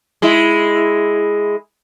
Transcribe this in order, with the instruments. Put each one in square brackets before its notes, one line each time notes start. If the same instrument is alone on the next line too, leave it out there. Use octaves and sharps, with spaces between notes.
[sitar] G#3 E4